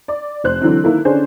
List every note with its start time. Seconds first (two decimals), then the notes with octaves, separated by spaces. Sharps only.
0.08 D5
0.44 F1 C5 F#6
0.61 D3 E3 F#3 C4
0.84 D#3 A#3 E4 A4
1.05 D3 C#4 D4 G#4 C5